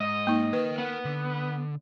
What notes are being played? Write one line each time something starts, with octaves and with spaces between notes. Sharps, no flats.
G#2 D#5
A#3 D#4
A#4 B4 G5
B3
D3